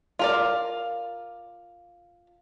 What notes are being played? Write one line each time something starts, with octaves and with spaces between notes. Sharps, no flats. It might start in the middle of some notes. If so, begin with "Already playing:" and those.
F4 A#4 D5